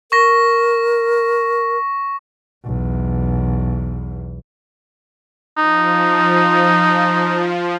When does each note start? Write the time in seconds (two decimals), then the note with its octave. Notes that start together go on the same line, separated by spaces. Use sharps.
0.12 A#4 C#6 A#6
2.65 B1 E2
5.57 F3 D#4